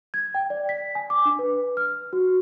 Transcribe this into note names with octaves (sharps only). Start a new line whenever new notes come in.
G#6
G5
D5
B6
G#5
D6
D4
B4
F6
F#4